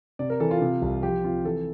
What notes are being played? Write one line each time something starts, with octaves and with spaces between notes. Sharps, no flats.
C3 D5
A#4
E3 A4
F4
C3
C2
F3 G4
C3 F4
E3 A4